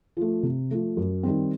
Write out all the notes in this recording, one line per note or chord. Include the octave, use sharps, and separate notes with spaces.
F3 A3
C3
F3 A3
F#2
D#3 G3 C4